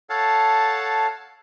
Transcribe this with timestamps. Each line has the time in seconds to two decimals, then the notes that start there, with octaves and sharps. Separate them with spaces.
0.10 A4 C#5 F5 F#5 A5